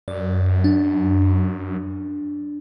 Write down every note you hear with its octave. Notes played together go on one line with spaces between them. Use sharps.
F#2 D5
D4